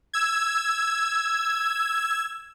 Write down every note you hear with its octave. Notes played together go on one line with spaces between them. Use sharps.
E6 G#6